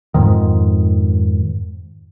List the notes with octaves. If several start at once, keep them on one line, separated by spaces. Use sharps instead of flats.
F2 G#2 D#3